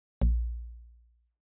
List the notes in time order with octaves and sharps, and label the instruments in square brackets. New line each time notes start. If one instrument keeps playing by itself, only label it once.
[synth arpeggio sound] A#1